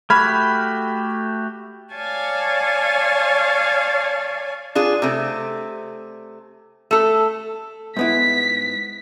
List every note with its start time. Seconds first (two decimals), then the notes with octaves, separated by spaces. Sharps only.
0.10 A3 F#4 G4 B5 F6 G#6
1.93 C#5 D5 F5 G#5 A5
4.75 D4 F4 G#4
5.02 C3 A3
6.91 A3 A4
7.97 G#2 B3 E4 B6